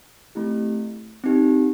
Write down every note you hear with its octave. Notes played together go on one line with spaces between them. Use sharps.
A3 C4 E4 G4
C4 D#4 G4